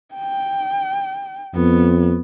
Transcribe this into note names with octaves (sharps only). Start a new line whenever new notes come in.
G5
F2 B3